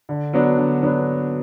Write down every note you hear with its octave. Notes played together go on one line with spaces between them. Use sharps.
D3
F#3 B3 D4
D3
F#3 B3 D4